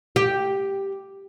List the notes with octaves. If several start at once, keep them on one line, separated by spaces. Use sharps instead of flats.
G4